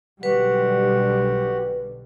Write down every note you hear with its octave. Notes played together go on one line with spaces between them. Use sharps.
B1 D3 G3 F#4 G4 B4 F#5